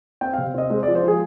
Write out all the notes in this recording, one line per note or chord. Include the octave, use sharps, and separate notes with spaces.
C4 G5
F5
C3
C4 D#5
G#3 C5
D5
F3
C5
F3 G#4